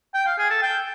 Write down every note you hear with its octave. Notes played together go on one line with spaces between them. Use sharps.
G5
F5
G#4
A4
G5